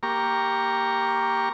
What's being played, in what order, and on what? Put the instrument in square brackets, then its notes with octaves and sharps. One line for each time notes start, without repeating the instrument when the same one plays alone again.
[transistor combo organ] A#3 G4 A#5 C#6